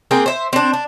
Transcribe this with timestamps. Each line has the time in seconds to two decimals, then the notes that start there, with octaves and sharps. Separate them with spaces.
0.11 A#3 C4 G#4 G5
0.26 C5 E5
0.53 C4 D4
0.73 D4